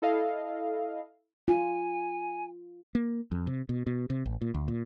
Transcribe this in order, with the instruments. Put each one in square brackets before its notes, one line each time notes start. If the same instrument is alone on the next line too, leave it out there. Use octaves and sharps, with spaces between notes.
[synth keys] E4 A4 D#5 F5
[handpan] F4 [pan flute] G#5
[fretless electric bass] A#3
F2
C3
B2
B2
C3
A1
A#2
D2
A#2